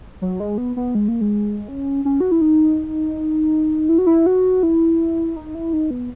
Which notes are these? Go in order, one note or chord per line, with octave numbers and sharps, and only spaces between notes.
F#3
G#3
B3
B3
G#3
A#3
G#3
C#4
C#4
F#4
E4
D#4
E4
F#4
E4
F#4
E4
D#4
E4
D#4
B3